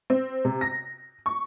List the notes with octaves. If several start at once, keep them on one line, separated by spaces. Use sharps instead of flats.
C4
C3
A#6
C#6